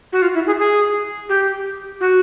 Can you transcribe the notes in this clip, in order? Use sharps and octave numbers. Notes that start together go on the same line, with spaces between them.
F#4
F4
E4
G#4
G#4
G4
F#4